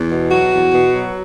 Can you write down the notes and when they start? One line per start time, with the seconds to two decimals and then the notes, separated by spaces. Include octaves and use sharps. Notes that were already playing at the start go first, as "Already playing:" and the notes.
Already playing: E2
0.10 B2
0.31 F#3 F#4
0.52 E2
0.73 B2
0.94 F#3